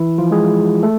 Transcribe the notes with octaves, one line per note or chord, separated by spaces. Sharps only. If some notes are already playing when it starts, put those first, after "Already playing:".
Already playing: E3 E4
F3 F4
G#3 G#4
A3 A4